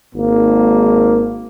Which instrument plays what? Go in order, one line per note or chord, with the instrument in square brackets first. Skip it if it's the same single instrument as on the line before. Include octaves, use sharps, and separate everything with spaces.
[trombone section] G#1 G#2 A#3